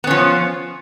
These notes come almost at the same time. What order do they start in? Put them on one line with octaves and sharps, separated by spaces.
B3 C#4 F3